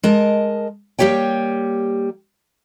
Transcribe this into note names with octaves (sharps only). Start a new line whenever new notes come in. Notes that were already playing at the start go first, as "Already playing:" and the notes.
G#3 A#4 D#5 A5
G3 A#3 G4 C#5 G5